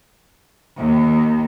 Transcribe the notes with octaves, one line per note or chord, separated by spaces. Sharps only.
D#2